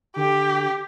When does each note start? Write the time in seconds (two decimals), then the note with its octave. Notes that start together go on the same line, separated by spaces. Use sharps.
0.16 D3 G4